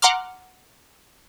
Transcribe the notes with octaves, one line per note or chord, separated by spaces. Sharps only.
F#5 A#5 C6 D6 F6